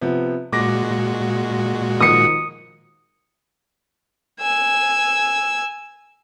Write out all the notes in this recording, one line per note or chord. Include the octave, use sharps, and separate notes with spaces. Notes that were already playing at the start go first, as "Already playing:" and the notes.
C3 F3 B3
A#2 G#3 F#4 D6 A#6
D#3 F3 D#6 C#7
G#5 E6